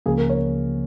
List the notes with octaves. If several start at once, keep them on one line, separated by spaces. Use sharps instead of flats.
C#2 C#3 F3 A#3 G#4
A#4
C#5